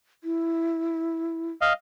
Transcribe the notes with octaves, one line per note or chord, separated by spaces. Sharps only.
E4
D#5 F5